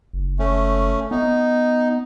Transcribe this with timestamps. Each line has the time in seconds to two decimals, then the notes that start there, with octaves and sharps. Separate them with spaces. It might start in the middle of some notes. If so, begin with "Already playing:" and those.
0.13 F#1
0.39 A3 C#4
1.11 B3 D#4